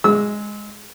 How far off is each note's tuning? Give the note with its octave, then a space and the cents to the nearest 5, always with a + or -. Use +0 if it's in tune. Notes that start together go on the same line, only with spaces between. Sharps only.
G#3 +0 E6 -30